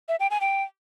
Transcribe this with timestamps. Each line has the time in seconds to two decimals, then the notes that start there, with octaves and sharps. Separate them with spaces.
0.09 E5
0.20 G5
0.31 G#5
0.41 G5